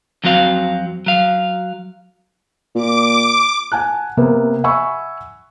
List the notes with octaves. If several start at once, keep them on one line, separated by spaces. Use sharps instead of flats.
F2 F#3 C4 F#4 F5
F#3 F5
A#2 D6
F#5 G#5 A5 F#6
C3 A#3 B3
E5 F#5 G#5 B5 C#6 E6